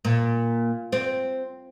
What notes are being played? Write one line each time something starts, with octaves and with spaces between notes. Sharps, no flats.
A#2
C4